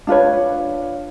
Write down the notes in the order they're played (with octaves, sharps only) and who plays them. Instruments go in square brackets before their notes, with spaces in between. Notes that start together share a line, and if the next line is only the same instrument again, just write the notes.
[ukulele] D4 F4 B4 C#5